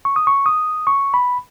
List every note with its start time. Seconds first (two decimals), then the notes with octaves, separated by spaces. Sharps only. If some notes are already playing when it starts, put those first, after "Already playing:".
0.05 C#6
0.16 D#6
0.27 C#6
0.46 D#6
0.87 C#6
1.14 B5